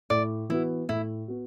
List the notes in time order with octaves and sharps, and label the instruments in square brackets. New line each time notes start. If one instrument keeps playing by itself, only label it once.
[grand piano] A2 [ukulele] D5
[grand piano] E3 B3 F#4 [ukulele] E4
[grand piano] A2 [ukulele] E4
[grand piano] B3 F#4